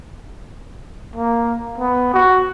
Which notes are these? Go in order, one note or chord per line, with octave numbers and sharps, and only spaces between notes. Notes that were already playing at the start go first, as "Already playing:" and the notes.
A#3
B3
F#4